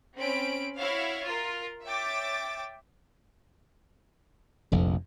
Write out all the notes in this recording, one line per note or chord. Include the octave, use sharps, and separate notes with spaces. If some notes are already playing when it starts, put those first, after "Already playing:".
C4 C#4 B5 D7
E4 F#4 C#5 E5 F5
F4 A#4
C#5 E5 G5 D6 A6
F1 A#1 F2